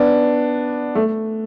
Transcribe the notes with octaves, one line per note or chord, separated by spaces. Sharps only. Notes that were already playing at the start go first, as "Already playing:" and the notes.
Already playing: B3 D4
A3